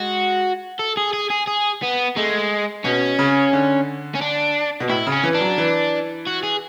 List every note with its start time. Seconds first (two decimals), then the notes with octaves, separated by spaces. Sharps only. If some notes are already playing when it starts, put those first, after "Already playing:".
Already playing: G#3 F#4
0.79 A4
0.97 G#4
1.13 G#4
1.30 G#4
1.47 G#4
1.82 B3
2.16 G#3 A3
2.84 B2 C#4
3.19 C#3
3.53 D3
4.15 C#4
4.21 D4
4.80 B2
4.89 A2 E4
5.07 C#3
5.12 C#4
5.23 E3
5.34 D4
5.40 F#3
5.58 E3
6.27 F#4
6.43 G#4